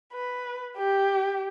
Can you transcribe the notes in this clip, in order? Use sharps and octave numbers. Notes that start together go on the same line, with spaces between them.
B4
G4